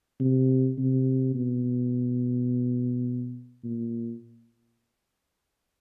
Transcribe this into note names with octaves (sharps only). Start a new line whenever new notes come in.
C3
C3
B2
A#2